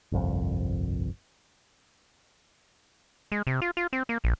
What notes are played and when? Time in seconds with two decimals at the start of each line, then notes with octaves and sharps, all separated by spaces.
0.12 G1 C2 F2
3.32 G#3
3.47 C3
3.62 F4
3.77 F4
3.93 C4
4.09 A#3
4.24 A#1